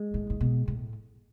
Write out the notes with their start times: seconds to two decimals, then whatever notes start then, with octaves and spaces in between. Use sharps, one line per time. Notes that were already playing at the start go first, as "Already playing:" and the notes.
Already playing: G#3
0.14 A2
0.30 A2
0.41 B2
0.68 A2